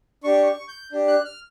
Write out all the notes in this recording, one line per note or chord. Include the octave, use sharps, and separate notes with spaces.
D4 G4 C#6
C#6
G6
D4 G4
F#6
F6